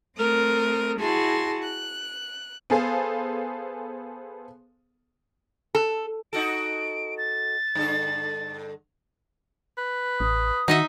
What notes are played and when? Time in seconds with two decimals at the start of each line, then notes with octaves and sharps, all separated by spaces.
0.17 A3 C4 A#4 D#6
0.98 E4 F#4 G#4 A5 C6
1.62 F#6
2.70 B3 G#4 A4 C5 F5 G#5
5.75 A4
6.33 D#4 F#4 A4 D7
7.18 A6
7.75 G2 D3 A4
9.78 B4
10.20 A1 D#6
10.68 D#3 D#4 F#4 D#5 E5